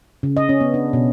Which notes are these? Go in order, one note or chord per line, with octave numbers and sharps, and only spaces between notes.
C#3
D#5
C#4
B3
D4
B2